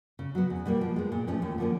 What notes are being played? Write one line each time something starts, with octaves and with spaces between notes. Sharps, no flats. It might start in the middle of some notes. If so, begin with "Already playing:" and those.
C#3
F#3 B3
E2
B2 G3 A#3
F3
G#3 B3
A#2
F3 A3 C#4
D#2
D3 F3 A#3 C#4